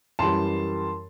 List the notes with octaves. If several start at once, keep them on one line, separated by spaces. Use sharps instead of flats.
F#2 E3 G3 A5 C6